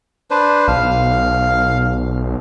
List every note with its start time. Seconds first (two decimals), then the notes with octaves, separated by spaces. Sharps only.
0.31 D4 B4 C5
0.68 B1 F5